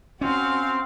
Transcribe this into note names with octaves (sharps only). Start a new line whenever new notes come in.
C4 C#4 F#4 F5